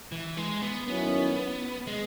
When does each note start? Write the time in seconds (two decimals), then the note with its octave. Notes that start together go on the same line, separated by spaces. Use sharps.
0.12 E3
0.37 G#3
0.62 B3
0.87 F#2 D#3 F#3 B3 C#4 E4
1.87 G#3